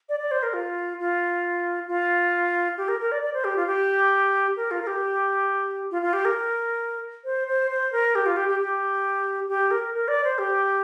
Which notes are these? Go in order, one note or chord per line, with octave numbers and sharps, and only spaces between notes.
D5
D5
C5
A#4
F4
F4
F4
G4
A#4
A#4
D5
D5
C5
G4
F4
G4
A#4
F4
A#4
G4
F4
F4
G4
A#4
C5
C5
C5
A#4
G4
F4
G4
G4
G4
G4
A#4
A#4
D5
C5
G4